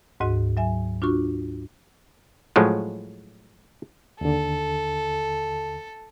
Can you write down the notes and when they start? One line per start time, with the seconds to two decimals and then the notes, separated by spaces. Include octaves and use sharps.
0.20 D2 G#2 F#4 D#5
0.57 F#3 E5 G#5
1.02 D4 F4 F#4 C#6
2.56 A2 F3 F#3 G#3
4.21 D#2 D3 A4